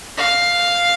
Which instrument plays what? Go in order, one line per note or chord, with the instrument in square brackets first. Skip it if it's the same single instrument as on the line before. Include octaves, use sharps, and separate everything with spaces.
[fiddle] F5